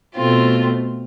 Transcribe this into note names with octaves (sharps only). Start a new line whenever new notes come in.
B2 A3 C4 F4